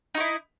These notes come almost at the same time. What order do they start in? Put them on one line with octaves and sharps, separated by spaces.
D#4 F#4 E4